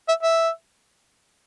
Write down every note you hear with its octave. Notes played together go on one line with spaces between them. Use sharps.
E5
E5